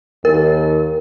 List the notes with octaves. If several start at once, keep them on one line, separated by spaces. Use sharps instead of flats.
D#2 A#4